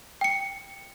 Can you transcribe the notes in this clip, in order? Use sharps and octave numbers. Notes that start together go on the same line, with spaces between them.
G5 C#7